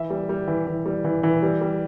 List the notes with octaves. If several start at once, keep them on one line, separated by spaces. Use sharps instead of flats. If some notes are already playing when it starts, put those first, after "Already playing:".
Already playing: E3 E5
G3
G3
E3
E3
G3
E3
E3
G3
G3